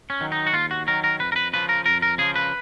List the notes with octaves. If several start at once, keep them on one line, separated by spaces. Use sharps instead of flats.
C#4
D#3 F#3
D#4
F#4
D#2 F4
F#4
D#3 F#3 A#4
A#4
F2 B4
A#4
B4
C#3 F3 B4
A#4
F2 A#4
A#4
C#3 F3 G#4
B4